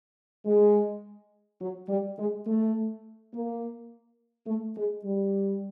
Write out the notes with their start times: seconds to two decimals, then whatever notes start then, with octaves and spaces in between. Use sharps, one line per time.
0.46 G#3
1.61 F#3
1.89 G3
2.18 G#3
2.47 A3
3.33 A#3
4.47 A3
4.76 G#3
5.05 G3